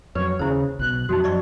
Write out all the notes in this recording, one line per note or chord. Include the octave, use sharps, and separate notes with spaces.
F2 F#3 B4 C#5
D#2 C#3 E4 C5
B1 B2 F#6
F2 F3 F#3 D#4 F#4
F#2 F3 F#3 D5 D#5 C#6